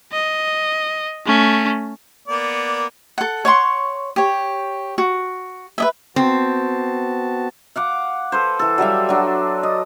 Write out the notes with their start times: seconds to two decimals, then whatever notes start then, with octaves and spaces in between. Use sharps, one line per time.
0.12 D#5
1.26 A3 C#4
2.28 A#3 B3 D5
3.18 A4 F#5
3.45 C#5 F#5 C6 C#6
4.16 G4 C#5
4.98 F#4
5.78 B4 D#5 E5
6.16 B3 C4 F#4 A5
7.76 F5 F#5 D6
8.32 A4 B4 C5
8.59 E3 A4
8.78 F#3 G3 E5 F5
9.09 F#3 D4
9.63 D#5